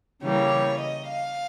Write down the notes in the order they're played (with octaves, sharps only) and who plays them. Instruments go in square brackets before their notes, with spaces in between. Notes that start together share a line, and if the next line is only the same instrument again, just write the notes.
[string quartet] C#3 E3 G3 A#3 C#5
D#5
F5